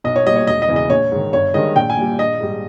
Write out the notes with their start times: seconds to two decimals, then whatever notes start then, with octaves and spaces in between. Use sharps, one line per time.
0.04 B1 D#5
0.16 C#5
0.26 A#2 G3 D#5
0.36 C#5
0.47 E1 D#5
0.62 D#5
0.68 E2 C#3 E3
0.76 D#5
0.90 A#1 C#5
1.12 G#2 D#3
1.33 G1 C#5
1.54 G2 D#3 G#3 D#5
1.76 A#1 G5
1.90 G#5
1.97 A#2 G3
2.18 A#1 D#5
2.40 G#2 G3